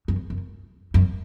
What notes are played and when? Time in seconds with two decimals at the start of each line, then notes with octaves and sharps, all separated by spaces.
0.08 F#2
0.30 F#2
0.94 F#2